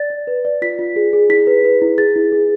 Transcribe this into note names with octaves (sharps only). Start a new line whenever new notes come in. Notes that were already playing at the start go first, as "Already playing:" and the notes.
Already playing: D5 A6
D5
B4
D5
F4 B6
F4
G#4
G#4
E4 B6
B4
B4
E4
G#4 A6
E4
G#4